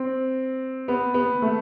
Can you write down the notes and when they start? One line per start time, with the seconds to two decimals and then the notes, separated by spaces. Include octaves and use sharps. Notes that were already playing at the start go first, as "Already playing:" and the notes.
Already playing: C4
0.88 B3
1.14 B3
1.42 A3